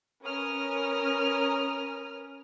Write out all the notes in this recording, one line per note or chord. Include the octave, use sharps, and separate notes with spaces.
C#4 A#4 B4 A#5 D#6 F6